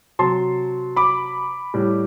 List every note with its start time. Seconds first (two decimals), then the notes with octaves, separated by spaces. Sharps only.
0.19 C3 F#3 A5 C6
0.96 B5 D6
1.74 A2 G3